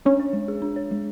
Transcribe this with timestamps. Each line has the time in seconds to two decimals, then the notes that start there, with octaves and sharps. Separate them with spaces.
0.05 C#4 D4
0.20 C#5
0.33 G#3
0.48 G#4
0.62 D4
0.76 C#5
0.91 G#3